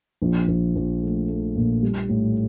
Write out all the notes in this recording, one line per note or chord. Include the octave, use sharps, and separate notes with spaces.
A#1
A#1
A#1
A3
A3
A#2
G3
A2